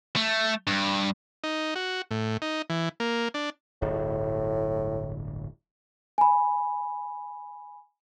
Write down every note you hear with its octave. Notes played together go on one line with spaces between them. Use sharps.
A3
G2
D#4
F#4
A2
D#4
E3
A#3
D4
D1 G1 A2
G#5 B5